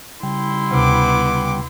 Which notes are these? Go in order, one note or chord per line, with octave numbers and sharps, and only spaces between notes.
C#3 G3 E4 G5 C6
D2 C3 B3 D6